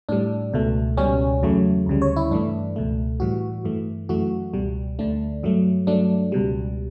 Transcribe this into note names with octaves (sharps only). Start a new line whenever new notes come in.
A2 G3 D4
C#2 B2 A3
C#2 B2 G3 C#4
E2 C#3 F#3 A3
D2 C#3 G3
C#5
E4
G2 E3 A3 D4
C#2 B2 A3
A2 E3 G3 F#4
G2 E3 A3
F#2 E3 A3 F#4
C#2 B2 G3
D2 D3 A3 D4
G2 F#3 A3
G2 F#3 A3 D4
C#2 B2 G3